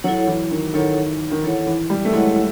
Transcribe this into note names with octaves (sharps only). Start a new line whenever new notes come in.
F#3 E4 A4 C#5 F#5
E3
D#3
D#3 E4 A4 C#5 F#5
D#3
E3 E4 A4 C#5 F#5
E3
G3
A3
G#3 E4 A4 C#5 F#5